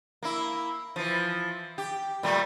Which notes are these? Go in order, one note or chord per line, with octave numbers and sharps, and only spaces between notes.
A#3 E4
E3 F3
G4
A#2 G3 A3